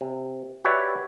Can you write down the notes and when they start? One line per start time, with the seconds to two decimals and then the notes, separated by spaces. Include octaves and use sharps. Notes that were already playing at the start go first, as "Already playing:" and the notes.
0.01 C3
0.64 F#4 G4 B4 C#5 D5 E5